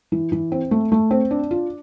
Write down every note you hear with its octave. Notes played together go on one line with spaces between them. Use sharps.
E3
E3
C4
A3
A3
C4
D4
F4